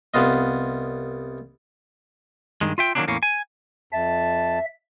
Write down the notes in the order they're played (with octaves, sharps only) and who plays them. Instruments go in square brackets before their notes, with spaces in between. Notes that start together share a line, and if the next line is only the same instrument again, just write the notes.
[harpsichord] C2 B3 F4 D#5
[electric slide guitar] G2 D#3 G#3
F4 E5 G5
D#3 F#3 G#3 A#3 C#4 D4
E2 A2 A#3 C#4
G#5
[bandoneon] F2 A5 [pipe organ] E5